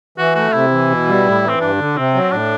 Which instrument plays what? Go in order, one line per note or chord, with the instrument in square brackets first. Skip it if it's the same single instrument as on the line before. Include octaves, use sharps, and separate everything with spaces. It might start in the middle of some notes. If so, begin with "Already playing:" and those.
[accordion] E3 [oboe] F#4
[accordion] A3 [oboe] F#4
[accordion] C3 [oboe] E4
[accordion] E3
B2
G3
A2
E3
[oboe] C4
[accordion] G2 [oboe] D4
[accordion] D3
[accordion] C3 [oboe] C4
[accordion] F#3
[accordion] A2 [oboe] D4